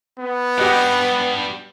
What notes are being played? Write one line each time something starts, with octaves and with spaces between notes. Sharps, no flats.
B3
G3 D4 G4 D#5 F#5